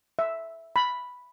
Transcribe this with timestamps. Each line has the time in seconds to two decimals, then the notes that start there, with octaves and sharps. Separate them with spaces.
0.19 E5
0.76 B5